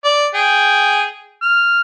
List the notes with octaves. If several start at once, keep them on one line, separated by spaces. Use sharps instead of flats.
D5
G#4 G5
F6